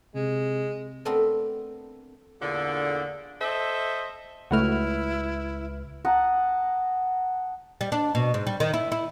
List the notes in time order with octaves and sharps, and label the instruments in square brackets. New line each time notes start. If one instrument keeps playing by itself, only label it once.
[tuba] C3 [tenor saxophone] G#3
[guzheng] A3 B3 C4 D4 A4 A#4
[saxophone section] E2 A#2 D3
A4 C5 D#5 E5
[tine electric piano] C#2 B4 F6 [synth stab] A3 F#4 [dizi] E4
[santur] F#5 A5 A#5 D#6
[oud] G3
D4
B2
G#2
G3
D#3
E4
E4